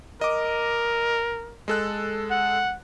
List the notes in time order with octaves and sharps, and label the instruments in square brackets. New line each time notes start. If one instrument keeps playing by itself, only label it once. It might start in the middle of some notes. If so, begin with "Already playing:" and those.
[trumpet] A#4 [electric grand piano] D#5 D6
[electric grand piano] G#3 A4 F#6
[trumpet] F#5